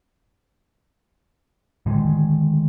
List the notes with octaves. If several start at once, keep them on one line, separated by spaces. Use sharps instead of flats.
A2 D3 D#3 G#3